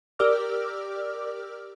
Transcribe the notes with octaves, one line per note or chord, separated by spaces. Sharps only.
G4 A#4 D5 D6 E6 F6